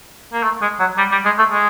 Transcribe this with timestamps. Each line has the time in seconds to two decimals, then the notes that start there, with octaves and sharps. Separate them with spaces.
0.33 A#3
0.43 A3
0.62 G#3
0.80 F#3
0.98 G3
1.12 G3
1.25 G#3
1.38 A3
1.52 G#3